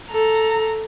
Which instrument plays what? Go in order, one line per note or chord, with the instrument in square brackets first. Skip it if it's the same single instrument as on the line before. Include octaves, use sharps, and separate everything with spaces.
[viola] A4 A#5